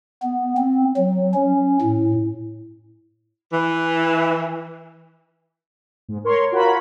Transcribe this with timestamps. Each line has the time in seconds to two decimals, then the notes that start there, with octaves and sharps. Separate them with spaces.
0.23 B3
0.57 C4
0.97 F#3
1.34 C#4
1.82 A2
3.53 E3
6.08 G#2
6.24 A#4 C#5 C6
6.52 F4 F#4 A#4 C#5 B5